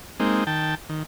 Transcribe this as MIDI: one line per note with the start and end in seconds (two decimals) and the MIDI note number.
0.20 0.44 56
0.20 0.44 58
0.20 0.44 60
0.20 0.44 63
0.47 0.75 51
0.47 0.75 79
0.47 0.75 81
0.89 1.03 51